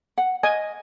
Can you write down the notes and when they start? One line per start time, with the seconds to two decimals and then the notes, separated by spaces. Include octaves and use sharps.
0.18 F#5
0.43 D#5 G#5